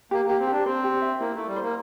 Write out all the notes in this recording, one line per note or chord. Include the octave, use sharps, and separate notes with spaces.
A#3 G4
A#3 G4
C4
D4 G4
C4 C5
G4
E5
A#3 E4
A3 E4
G3
C5
A#3